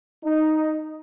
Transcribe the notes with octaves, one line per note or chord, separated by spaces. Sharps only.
D#4